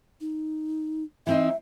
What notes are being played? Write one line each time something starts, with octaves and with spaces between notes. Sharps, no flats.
D#4
E3 C4 D#4 E5